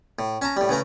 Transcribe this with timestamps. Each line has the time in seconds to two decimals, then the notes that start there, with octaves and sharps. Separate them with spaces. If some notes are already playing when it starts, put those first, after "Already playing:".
0.19 A2
0.42 C#4 A5 A#5
0.57 A2 G3
0.69 C#3 E3 A3 A#4